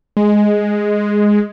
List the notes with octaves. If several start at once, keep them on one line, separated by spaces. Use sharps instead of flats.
G#3